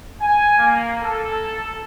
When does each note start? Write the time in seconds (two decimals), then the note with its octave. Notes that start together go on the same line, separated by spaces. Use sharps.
0.21 G#5
0.58 A#3
1.02 A4